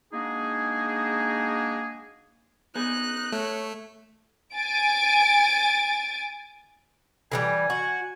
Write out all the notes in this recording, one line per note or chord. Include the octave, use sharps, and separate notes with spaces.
G#3 A#3 D4 D#4 F#4 G#4
B3 D#4 G#4 F#6
A3 C#5
G#5 A6 D7
D3 E3 G3 G#5
F#4